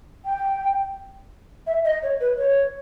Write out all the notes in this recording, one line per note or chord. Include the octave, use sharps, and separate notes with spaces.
G5
E5
D#5
C#5
B4
C#5